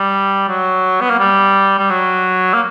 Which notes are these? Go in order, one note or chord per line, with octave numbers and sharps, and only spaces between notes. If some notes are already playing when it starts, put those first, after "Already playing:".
Already playing: G3
F#3
B3
A#3
G3
G3
F#3
A#3